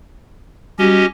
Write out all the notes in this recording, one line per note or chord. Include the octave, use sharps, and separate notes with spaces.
G3 C#4 F#4 G4 D#5